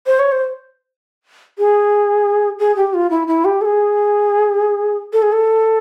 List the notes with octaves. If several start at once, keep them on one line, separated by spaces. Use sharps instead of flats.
C5
C#5
C5
G#4
G#4
G4
F4
E4
E4
G4
A4
G#4
A4
G#4
A4